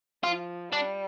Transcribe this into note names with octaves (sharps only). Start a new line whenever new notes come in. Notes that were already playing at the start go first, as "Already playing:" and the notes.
F3 F4
G3 D4